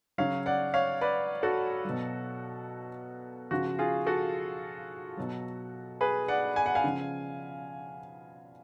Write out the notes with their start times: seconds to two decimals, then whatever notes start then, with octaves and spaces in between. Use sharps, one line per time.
0.18 C#3 F#3 C#5 F5
0.46 D5 F#5
0.74 C#5 F5
1.01 B4 D5
1.43 F#4 A4
1.85 B2 F#3
3.51 C#3 F3 F#4
3.79 F4 G#4
4.07 F#4 A4
5.17 B2 F#3
6.01 G#4 B4
6.28 D5 F#5
6.56 G#5
6.66 F#5
6.75 F5 G#5
6.84 C#3 F3